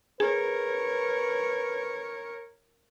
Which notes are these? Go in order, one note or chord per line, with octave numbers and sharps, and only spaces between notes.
G#4 A#4 B4 C#5